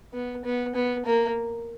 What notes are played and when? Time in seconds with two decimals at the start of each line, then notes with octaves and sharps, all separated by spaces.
0.13 B3
0.45 B3
0.75 B3
1.06 A#3